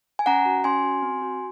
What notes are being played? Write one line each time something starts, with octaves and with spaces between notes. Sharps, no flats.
G#5
C#4 F#5 A#5
F#4
C#4 G#5 C6
F#4
C4
F#4